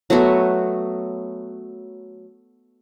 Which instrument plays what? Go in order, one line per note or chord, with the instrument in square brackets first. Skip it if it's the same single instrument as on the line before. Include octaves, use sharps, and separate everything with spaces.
[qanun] F#3 A3 B3 F#4